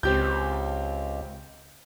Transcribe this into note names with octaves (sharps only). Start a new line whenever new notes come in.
C#2 C4 G4 G6